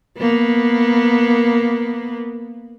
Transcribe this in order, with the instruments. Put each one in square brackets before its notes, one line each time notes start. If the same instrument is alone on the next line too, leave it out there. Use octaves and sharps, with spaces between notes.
[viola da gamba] A#3 B3